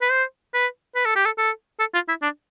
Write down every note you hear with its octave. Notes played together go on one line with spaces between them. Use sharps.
B4
C5
B4
B4
A4
G4
A4
A4
A4
F4
E4
D4